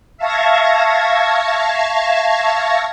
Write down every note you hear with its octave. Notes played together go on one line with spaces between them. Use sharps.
E5 F5 A5 C#6 G#6 A#6